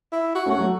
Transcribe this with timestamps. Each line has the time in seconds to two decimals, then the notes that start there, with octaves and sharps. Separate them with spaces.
0.12 E4
0.35 F#4
0.46 A3 C#4
0.51 F#4
0.58 F#3 A3